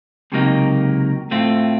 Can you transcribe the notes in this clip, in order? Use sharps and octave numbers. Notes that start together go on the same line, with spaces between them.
C#2 C3 F#3 A#3 D#4
A2 A3 C4 F4